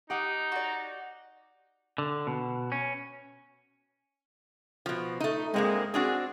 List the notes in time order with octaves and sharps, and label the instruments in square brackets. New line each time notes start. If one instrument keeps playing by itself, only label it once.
[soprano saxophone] D#4 [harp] G4 F#5 D#6
[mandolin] F#4 D5
[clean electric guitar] D3
B2
C#4
[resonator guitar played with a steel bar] B2 F3
A3 D#4
[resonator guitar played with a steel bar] G2 A#3 C4 [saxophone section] G#3
[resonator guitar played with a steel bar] C4 D4 F#4 [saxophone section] G#4